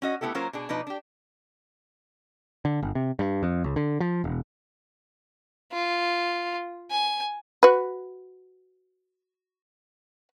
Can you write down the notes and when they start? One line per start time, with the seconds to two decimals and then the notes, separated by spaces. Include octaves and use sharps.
0.02 C#4 F#4 D#5
0.21 A3 B3 E4 G4 A4
0.34 F#3 A#3 C#4 F4 A#4 C5
0.53 B2 D4 G#4
0.69 B2 F3 D4 D#4 B4
0.87 D4 G4
2.65 D3
2.83 G1
2.95 C3
3.19 G2
3.43 F2
3.64 C#2
3.76 D3
4.00 F3
4.24 E1
5.73 F4
6.91 G#5
7.63 F#4 B4